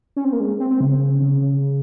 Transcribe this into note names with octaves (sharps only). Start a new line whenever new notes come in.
C#4
C4
A#3
G#3
C4
C4
C#3
C#3
C#3